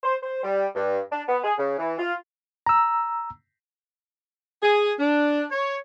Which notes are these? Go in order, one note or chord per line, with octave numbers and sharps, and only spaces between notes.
C5
C5
G3
G2
D4
B3
G#4
C#3
E3
F4
A#5 E6
G#4
D4
C#5